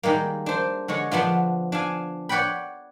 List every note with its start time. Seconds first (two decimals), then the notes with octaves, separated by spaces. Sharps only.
0.03 D#3 G3 G#3 A#3
0.46 D4 C5
0.88 D3 G#3 C#5
1.11 F3 B3 D4 F4
1.72 D4 F5 G#5
2.29 B4 C#5 D5 F#5 G5 B5